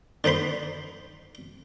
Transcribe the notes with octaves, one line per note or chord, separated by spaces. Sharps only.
D3 D#4 C5 B5 C6